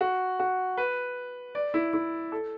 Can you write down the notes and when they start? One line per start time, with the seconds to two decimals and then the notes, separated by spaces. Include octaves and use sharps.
0.01 F#4
0.40 F#4
0.78 B4
1.55 D5
1.74 E4
1.93 E4
2.32 A4